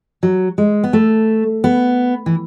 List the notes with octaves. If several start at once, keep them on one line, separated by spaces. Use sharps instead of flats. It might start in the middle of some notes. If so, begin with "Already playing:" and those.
F#3
G#3
B3
A3
B3
E3